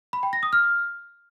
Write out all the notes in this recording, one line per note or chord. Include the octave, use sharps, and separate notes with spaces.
B5
G5
A#6
D#6
F6